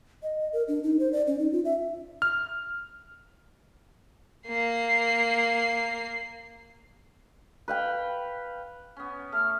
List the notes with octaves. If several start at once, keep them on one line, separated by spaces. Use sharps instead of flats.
D#5
D#5
A#4
D4
D#4
C5
D5
C#4
D#4
F4
E5
F6
A#3 C7
B4 F5 G5
B3 C#4
A3 F6